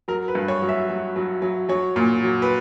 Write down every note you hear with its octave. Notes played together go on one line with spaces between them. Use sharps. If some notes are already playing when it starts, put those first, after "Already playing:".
F#3 A#4
B4
G2
C#5
F#3
E5
F#3
F#3
F#3
F#3 C#5
A#2
F#3
B4